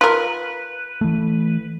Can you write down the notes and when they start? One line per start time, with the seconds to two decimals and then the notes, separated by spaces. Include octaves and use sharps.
0.01 F4 A#4 B4
1.01 E3 A3